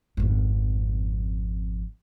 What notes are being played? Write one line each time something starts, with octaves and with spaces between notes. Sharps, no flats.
G#1 F2